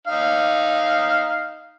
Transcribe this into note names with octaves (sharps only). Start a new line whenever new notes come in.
D#4 F5